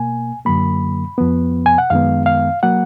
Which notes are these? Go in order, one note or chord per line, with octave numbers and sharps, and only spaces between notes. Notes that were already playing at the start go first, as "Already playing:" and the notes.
Already playing: B2 A#3 G#5
F#2 D3 F#3 A#3 B5
F2 F3 B3
G#5
F#5
F#2 D#3 G#3 B3 F5
F5
F#3 A#3 F#5